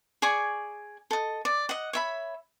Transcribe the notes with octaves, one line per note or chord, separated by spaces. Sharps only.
G#4 D5 G#5 C#6
A4 D#5
D5
D#5 F#5
C#5 E5 B5